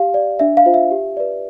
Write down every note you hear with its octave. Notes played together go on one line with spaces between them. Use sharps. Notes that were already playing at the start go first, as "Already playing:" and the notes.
Already playing: G4 F5
D5
D4 E5
F5
F4 C5
E5
G4
B4 D5